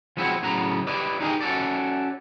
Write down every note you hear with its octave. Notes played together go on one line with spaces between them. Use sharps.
F3 G#3 B3 C4 E4 F#4
A2 C#3 F#3 B3 A#5
E4 G4 B4 D5 D#5
D#4 G4 G#4 A#4 D#5
C#4 F#4 A4 D5